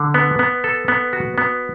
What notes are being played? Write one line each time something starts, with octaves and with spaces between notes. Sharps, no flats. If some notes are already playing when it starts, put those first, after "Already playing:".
Already playing: D3
B3
B3
A4
B3
F#4
B3